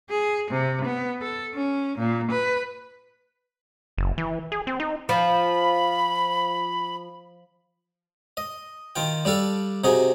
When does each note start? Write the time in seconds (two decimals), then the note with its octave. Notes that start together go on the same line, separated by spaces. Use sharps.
0.10 G#4
0.51 C3
0.85 B3
1.22 A4
1.54 C#4
1.98 A#2
2.31 B4
3.97 F#1
4.18 E3
4.52 G#4
4.67 C4
4.80 D#4
5.09 F3 B5
8.37 D#5
8.96 D#3 F4 G5
9.25 G3 D4 A4 F5
9.84 C3 D#4 F#4 G#4